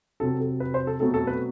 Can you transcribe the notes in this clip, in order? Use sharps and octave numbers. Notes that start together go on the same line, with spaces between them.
C3 F#3 C4 A4
A4
B4
C5
A4
B2 F#3 A3 C4 A4
A4
B4